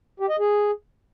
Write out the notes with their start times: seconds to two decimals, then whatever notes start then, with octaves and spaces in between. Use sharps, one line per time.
0.20 G4
0.29 D#5
0.39 G#4